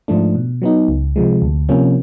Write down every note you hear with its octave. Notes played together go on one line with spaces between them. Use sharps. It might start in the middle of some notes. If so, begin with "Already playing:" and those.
G#2 F3 A3 D4
B2
F#3 B3 D#4
C#2
C3 F3 G#3
D2
C3 F3 A#3 C#4